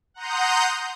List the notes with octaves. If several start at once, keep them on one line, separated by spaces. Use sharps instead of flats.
F#5 A#5 C6 D#6 G6